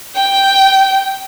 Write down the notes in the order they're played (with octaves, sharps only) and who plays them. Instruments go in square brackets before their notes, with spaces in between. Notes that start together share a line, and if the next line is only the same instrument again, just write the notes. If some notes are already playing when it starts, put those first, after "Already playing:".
[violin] G5